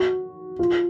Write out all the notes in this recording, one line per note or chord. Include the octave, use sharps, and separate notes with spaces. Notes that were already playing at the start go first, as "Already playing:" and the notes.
Already playing: F#4
F4